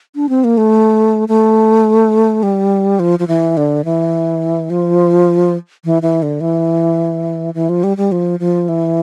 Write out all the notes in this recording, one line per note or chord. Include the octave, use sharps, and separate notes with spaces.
D4
C4
A#3
A3
A3
G3
F3
F3
E3
D3
E3
F3
E3
E3
D3
E3
E3
F3
G3
G3
F3
F3
E3